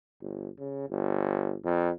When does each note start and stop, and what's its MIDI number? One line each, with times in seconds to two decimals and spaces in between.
0.21 0.48 31
0.59 0.86 49
0.89 1.55 31
1.64 1.90 41